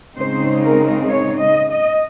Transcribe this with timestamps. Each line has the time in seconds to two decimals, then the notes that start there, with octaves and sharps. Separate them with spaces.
0.15 C#3 G#3 C4 D#4 C5
0.62 A#4
1.09 C#5
1.39 D#5
1.71 D#5